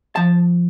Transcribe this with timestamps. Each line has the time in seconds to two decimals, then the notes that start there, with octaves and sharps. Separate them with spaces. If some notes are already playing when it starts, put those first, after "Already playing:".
0.16 F3 A5